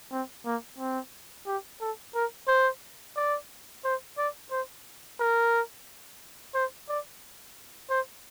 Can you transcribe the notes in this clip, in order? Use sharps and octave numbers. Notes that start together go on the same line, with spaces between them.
C4
A#3
C4
G4
A4
A#4
C5
D5
C5
D5
C5
A#4
C5
D5
C5